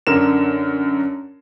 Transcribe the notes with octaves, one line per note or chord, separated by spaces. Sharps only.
F#2 D3 A#4 E7